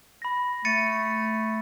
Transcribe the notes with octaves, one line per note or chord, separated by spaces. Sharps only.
B5 A#6
A3 A6 C#7 D#7